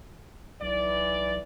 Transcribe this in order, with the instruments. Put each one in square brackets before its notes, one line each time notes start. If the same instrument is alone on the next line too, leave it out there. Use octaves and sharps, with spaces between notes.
[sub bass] B1 [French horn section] E3 D5